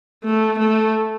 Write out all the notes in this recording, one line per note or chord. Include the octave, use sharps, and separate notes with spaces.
A3
A3